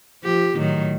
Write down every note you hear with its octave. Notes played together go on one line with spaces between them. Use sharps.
F3 G4
A2 D#3 F#3